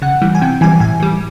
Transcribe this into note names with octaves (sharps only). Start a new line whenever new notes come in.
C#3 F#5
E3 G3
G#5
C3 G5
E3 G3 G#5
A2 G#5
E3 G3